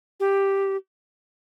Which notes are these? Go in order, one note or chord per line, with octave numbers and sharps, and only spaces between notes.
G4